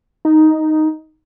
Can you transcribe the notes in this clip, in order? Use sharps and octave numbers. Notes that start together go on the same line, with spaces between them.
D#4